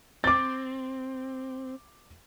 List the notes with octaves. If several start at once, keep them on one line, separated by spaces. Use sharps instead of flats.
C4 D6 A6